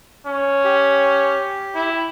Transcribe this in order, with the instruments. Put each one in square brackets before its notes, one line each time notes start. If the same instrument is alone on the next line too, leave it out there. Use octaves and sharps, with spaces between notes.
[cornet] C#4
[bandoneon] G4
[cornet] E4